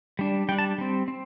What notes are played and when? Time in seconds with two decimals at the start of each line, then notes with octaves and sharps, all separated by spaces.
0.19 G3 D4
0.49 G3 G5
0.52 D4
0.59 A5
0.78 G3 C4
1.08 C4